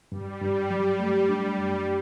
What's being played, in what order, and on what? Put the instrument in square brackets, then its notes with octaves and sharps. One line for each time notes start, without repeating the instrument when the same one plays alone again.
[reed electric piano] G2 [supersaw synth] G3
[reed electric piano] G2
F#3
A3
D4
F#2